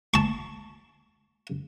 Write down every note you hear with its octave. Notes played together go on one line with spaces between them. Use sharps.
A5 C#6